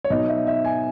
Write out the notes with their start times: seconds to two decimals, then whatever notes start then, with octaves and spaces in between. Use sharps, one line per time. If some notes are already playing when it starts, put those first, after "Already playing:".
0.04 C#5
0.10 B2 F#3 B3 D#4 D#5
0.29 E5
0.47 E5
0.65 G#5